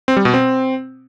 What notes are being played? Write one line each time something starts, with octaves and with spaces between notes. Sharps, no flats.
C4
G3
B2
C4